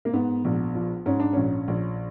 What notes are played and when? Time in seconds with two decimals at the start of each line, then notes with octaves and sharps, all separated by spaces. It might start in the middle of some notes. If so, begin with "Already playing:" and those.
0.05 A#3
0.13 G#2 B3
0.44 A#1
0.75 F3
1.06 G#2 C#4
1.20 D4
1.33 A#1 C#4
1.68 A#1